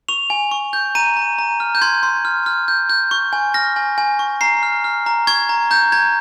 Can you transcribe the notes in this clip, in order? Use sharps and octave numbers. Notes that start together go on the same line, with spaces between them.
C#6 F7
G#5
C#6
G6
A#5 D#7
A#5
A#5
F6
G6
C6 G#6
C6
F6
F6
G6
G6
C#6
G#5
F6 A#6
G#5
G#5
C#6
A#5 C7
F6
F6
A#5
C#6 G#6
A#5
A#5 G6
A#5 G#6